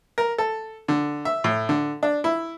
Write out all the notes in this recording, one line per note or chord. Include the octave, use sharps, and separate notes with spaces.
A#4
A4
D3
E5
A2
D3
D4
E4